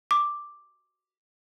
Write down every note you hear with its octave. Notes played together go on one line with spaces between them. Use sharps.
D6